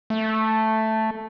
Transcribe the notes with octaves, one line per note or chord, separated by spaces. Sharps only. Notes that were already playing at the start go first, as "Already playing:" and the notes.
A3